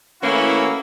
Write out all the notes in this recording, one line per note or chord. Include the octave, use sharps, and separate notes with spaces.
E3 A3 A#3 C#4 E4 F#4